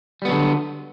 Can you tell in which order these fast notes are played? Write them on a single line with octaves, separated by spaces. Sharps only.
G3 B3 F#3 D3